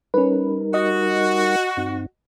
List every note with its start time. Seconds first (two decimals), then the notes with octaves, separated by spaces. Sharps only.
0.14 G3 C#4 D#4 A#4 B4
0.74 F#4 D#5
1.77 G2 C4 D#4